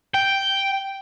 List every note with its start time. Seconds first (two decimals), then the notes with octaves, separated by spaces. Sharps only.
0.14 G5